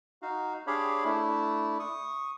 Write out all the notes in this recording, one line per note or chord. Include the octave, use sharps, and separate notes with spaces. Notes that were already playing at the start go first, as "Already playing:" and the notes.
D#4 F#4 F5
D4 G4 G#4 C#5 F5 B5
A3 D4 E4
C#6 D#6